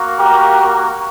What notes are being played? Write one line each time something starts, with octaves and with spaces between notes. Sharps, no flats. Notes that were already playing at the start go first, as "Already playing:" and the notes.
Already playing: A#3 F#4
G4 A#4